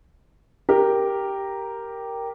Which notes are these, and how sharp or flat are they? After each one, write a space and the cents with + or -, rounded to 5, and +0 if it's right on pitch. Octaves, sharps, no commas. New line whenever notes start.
G4 +0 A#4 +0